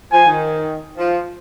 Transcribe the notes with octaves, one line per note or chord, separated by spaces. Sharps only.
F3 G#5
D#3
F3